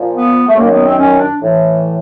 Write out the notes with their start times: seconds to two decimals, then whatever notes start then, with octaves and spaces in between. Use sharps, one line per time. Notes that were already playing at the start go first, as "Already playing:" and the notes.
Already playing: A#2 F3
0.15 B3
0.47 A3
0.56 F#2 D#3 F#3 A#3
0.70 B3
0.84 C4
0.98 C#4
1.19 D4
1.41 A2 E3